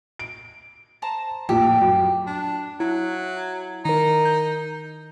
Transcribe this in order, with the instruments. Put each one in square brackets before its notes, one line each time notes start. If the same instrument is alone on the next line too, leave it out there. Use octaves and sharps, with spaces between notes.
[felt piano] D7
[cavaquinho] C5 A5 A#5
[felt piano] A#1 F2 A2 [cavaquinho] G4 A4
[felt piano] F#2
[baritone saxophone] D4
[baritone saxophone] F#3 [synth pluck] E4
[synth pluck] D#3 A#4 [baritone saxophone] D#4
[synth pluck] G6